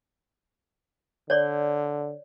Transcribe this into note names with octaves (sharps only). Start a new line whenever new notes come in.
D3 C#5 D5